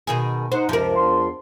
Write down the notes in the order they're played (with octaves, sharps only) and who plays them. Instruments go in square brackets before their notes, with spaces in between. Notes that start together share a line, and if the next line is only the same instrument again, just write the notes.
[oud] B2 D#3 G#4
[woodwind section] D#4 F#5 [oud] C5
[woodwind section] C#2 F#2 C3 [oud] F3 A#4
[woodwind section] E2 D4 C6